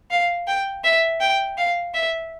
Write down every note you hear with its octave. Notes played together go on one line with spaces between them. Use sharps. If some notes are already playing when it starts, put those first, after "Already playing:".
F5
G5
E5
G5
F5
E5